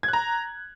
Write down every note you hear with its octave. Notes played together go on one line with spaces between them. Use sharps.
G#6
F#6
A#5